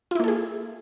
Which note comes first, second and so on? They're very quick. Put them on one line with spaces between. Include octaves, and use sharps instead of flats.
F4 E4 A#3 A4 G#4